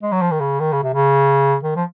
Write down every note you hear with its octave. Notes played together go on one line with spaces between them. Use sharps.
G#3
F#3
F3
D#3
C#3
D#3
C#3
C3
C#3
D#3
F3